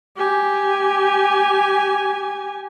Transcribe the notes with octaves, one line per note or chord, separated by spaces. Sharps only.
G4 G#5